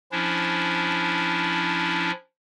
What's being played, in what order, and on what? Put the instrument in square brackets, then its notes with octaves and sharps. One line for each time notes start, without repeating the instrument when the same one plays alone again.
[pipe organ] F3 C#4 D4 E4